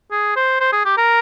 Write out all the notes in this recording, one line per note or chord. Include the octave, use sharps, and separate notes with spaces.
G#4
C5
C5
G#4
G4
A#4